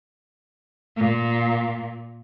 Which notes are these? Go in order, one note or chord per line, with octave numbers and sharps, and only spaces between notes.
A#2